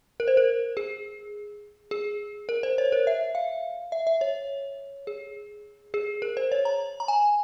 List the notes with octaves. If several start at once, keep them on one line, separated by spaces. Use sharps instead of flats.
A#4
C5
A#4
G#4
G#4
A#4
C5
C#5
A#4
E5
F5
E5
E5
C#5
G#4
G#4
A#4
C5
C#5
A#5
A#5
G#5